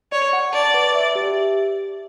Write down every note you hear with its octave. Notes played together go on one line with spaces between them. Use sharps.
C#5 D5
F#5
D5 A5
B4
E5
G4